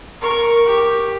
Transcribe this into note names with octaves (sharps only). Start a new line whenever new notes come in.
A#4 C#6
G4